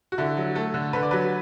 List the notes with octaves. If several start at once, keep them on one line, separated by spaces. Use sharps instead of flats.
F#4
D3 E4
F#3
A3 A4
D3
D3 B4
D5
F#3 B4